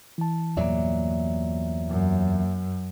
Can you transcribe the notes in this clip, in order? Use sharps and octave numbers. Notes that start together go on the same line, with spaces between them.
E3 A5
E2 G2 A#2 F#3 A#3 D5 E5
F#2